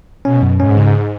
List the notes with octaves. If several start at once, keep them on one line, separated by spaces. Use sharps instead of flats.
B2 C#4
F#2
G#2 C#4
C#3